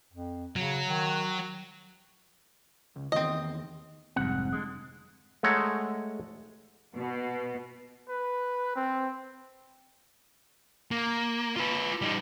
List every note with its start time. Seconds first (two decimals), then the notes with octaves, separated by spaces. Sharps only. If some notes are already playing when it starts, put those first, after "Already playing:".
0.13 F2
0.56 C#3 F#3
0.87 D#3
2.96 C#2
3.12 E2 D#3 C4 D#5
4.16 F1 G#2 E3 G3 C4 F#5
4.53 D3 G#3
5.43 G#3 A3 C#5 F#5 A#5
6.95 B2
8.09 B4
8.76 C4
10.91 A#3
11.56 F4 B4
12.02 G3 D#4